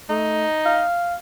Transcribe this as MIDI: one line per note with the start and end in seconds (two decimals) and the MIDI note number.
0.09 0.46 57
0.09 0.82 63
0.66 1.15 77